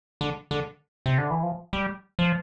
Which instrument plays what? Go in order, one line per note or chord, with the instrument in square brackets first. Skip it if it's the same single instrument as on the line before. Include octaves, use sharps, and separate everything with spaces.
[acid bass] D3
D3
C3
D3
E3
F3
G3
F3